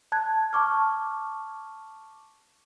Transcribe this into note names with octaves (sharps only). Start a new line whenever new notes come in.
A5 F#6 G#6
A5 C#6 D6 F6